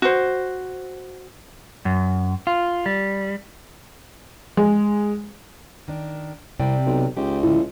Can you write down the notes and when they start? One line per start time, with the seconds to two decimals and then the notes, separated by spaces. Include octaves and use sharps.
0.02 F#4 C5
1.85 F#2
2.47 F4
2.86 G3
4.57 G#3
5.88 D#3 D4
6.59 C2 C3 D5 G5
6.86 B1
7.17 C#2 D#4 G4
7.43 A2 D3 F3 E4